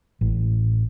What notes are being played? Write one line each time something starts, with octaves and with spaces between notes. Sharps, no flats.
A1